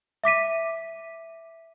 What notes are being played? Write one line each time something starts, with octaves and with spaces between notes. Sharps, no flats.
E5 D6 B6 D#7